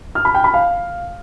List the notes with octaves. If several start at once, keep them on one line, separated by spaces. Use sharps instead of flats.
F6
B5
G5
B5
F5